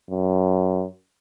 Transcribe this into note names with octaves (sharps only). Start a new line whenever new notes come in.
F#2